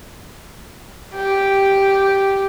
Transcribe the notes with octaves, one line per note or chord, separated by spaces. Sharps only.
G4